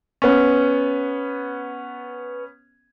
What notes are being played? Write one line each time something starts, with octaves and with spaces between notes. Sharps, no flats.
B3 C#4